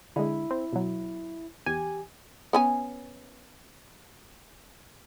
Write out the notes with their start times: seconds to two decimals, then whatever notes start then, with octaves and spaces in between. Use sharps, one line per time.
0.16 D3 G#3 E4
0.51 C4
0.73 B2 F#3
1.66 E2 G4 G#5
2.53 B3 C#4 G#5